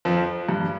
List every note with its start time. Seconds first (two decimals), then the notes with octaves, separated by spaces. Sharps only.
0.05 F2 F3
0.49 G2